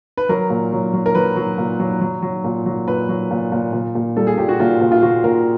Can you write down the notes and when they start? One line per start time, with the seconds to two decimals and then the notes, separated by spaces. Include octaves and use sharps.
0.17 B4
0.29 F#3 A#4
0.50 A#2
0.72 F#3
0.93 F#3
1.06 A#4
1.15 F#3 B4
1.36 F#3
1.58 A#2
1.80 F#3
2.01 F#3
2.22 F#3
2.44 A#2
2.66 F#3
2.87 A#2 B4
3.09 F#3
3.31 A#2
3.52 A#2
3.73 A#2
3.95 A#2
4.16 G3 A4
4.27 G#4
4.38 A#2 G4
4.49 F#4
4.60 A#2 F4
4.81 A#2
4.92 F4
5.02 A#2 F#4
5.24 A#2 A#4